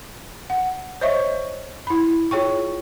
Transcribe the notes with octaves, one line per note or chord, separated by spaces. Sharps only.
F#5
C5 C#5 D#5 E5 C#6
E4 B5
F4 G#4 C#5 G5 C#6